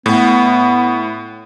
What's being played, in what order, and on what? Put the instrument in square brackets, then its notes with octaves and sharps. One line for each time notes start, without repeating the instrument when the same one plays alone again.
[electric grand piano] A2 [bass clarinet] B3